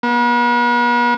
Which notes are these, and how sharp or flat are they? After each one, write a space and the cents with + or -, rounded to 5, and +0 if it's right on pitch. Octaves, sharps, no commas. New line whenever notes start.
B3 -45